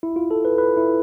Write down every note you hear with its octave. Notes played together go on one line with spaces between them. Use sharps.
E4
F4
A4
B4
B4
E4